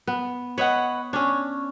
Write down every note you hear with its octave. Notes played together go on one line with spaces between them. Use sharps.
B3
B4 C#5 D#5 F#5
C#4 D4 C#5